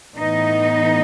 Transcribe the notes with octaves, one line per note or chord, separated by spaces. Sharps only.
A2 E3 B3 D#4